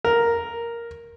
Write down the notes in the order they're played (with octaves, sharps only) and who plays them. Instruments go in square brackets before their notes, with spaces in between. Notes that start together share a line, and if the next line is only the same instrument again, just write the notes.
[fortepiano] A#4